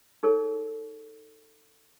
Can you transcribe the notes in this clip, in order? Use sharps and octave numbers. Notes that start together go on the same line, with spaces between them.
D#4 G#4 A4 C#5